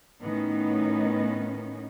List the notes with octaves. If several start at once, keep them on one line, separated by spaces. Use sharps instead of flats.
A2 D#3 B3 C#4 D#4